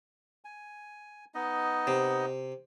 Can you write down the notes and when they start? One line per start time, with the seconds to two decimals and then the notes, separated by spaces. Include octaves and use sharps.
0.45 G#5
1.34 B3 D#4 D#5
1.87 C3